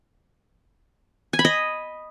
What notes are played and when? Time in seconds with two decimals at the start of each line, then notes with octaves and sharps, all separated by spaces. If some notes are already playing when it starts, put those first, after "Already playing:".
1.33 G#5
1.39 B5
1.45 D#5